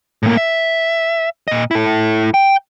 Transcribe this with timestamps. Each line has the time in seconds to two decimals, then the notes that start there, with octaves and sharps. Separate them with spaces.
0.23 A2 A#3
0.37 E5
1.48 A#2 D#5
1.71 E4 A4
2.34 G5